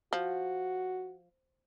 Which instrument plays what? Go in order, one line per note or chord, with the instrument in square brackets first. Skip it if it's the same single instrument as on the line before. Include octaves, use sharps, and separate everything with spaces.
[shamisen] F3 [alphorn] F#4